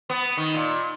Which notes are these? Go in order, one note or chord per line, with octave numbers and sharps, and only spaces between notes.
B3
D#3
A#2